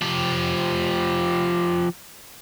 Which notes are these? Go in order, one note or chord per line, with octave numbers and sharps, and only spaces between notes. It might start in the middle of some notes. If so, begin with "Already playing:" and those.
F3 G4